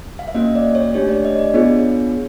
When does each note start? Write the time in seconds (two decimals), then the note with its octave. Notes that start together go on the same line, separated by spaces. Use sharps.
0.19 F5
0.28 E5
0.35 A#3 C#4 F#4 D#5
0.55 D5
0.75 C#5
0.94 A3 D4 G4 C#5
1.09 D5
1.25 D#5
1.39 D5
1.54 B3 D4 F4 G#4 C#5